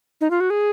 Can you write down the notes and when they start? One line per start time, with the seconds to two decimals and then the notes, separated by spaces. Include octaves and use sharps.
0.21 D#4
0.31 F4
0.40 F#4
0.50 G#4